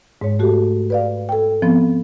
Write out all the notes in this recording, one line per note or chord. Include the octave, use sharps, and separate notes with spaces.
G#2 G#3 C#5
A3 F#4 G4 A4
B4 D5 F5
A4 G5
F3 B3 C4